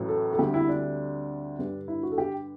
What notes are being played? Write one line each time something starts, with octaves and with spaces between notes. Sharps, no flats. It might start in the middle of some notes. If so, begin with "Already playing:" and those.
Already playing: A1 A2 F#3 A3
A4
A4
D2 D3 G3 C4 G4
E4
D4
G2 D3 G3
E4
F#4
A4
G4